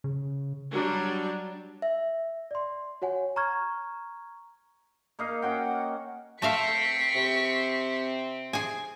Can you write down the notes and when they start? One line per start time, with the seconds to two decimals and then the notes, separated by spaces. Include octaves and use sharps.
0.04 C#3
0.73 F#3 G3 D4
1.82 E5
2.51 D5 C6
3.02 F#4 C#5 F#5 G#5
3.36 A#5 C#6 F6 G#6
5.19 A#3 D#4 F5
5.42 C#4 F#4 F#5 G5
6.42 A3 C4 E5 F5 C#6 B6
7.15 C3
8.53 G#4 G#5